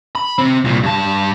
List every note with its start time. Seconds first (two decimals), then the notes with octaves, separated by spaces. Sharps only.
0.15 B5
0.38 C3 C4
0.64 C2 A#2
0.83 G2 A5